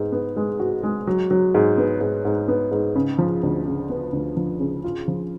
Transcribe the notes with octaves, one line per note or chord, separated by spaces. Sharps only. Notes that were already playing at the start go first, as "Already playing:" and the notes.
Already playing: G#2 B3
B3
G#3
F#4
G#3
F#3
F#3
G#2
B3
G#2
G#2
B3
G#2
C#3
F3
D2
C#3
B3
D2
F3
C#3
F4
F3